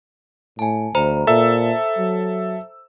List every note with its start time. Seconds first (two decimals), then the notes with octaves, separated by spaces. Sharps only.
0.59 A2 G#5 A5
0.95 D2 C5 A#5 B5
1.27 A#2 A4 E5 E6
1.98 F#3